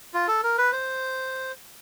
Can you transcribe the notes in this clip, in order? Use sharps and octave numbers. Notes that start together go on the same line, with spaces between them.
F4
A4
A#4
B4
C5